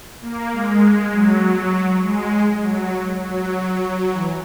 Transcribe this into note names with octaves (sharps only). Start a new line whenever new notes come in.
A#3
G#3
F#3
F#3
G#3
G#3
F#3
F#3
F#3
E3